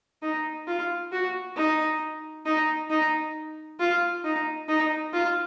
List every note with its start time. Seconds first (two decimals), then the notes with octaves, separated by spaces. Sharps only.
0.22 D#4
0.68 F4
1.12 F#4
1.57 D#4
2.46 D#4
2.90 D#4
3.79 F4
4.24 D#4
4.68 D#4
5.13 F4